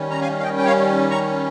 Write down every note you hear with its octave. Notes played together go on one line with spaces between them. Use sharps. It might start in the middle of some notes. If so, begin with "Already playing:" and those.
Already playing: D#3 G3 C#4
A#5
F5 G#5
F5
D#5 G5
G5
C#5 F5
A#5 C#6